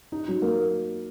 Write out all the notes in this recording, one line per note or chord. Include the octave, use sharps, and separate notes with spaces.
D#4
F#3
A#3